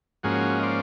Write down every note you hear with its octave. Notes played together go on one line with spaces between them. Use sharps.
G#2 F3 A#3 C#4 F#4 G#4
D#5
C5 D5